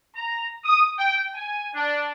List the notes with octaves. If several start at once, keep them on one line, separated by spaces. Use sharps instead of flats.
A#5
D#6
G5
G#5
D4